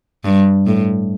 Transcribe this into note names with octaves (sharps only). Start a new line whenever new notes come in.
G2
A2